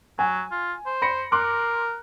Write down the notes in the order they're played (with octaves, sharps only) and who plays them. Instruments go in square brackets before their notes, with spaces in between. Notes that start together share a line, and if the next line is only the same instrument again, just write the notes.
[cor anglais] F#3 [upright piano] G#5
[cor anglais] F4
C5
[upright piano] B5 A#6 C#7
[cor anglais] A#4 [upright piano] C6 D6 F#6